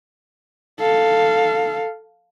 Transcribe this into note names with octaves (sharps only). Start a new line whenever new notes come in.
A4 F5